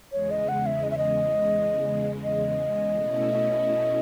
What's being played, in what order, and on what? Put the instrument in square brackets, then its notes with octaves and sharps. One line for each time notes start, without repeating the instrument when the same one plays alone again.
[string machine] E2 C#3 G#3 [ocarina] C#5
[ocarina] D#5
F#5
E5
D#5
E5
D#5
D#5
[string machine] B2 A3 C#4 E4